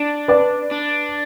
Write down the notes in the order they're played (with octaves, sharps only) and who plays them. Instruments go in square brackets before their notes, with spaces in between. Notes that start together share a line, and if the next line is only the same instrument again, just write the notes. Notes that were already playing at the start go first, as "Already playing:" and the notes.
Already playing: [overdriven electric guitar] D4
[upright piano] B4 D5
[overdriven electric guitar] D4